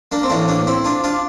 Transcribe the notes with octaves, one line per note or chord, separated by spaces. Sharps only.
A#3 D4
C4
A2 E3 A#3 D4
A#3 D4
C4 E4
D4 F4
D4 F4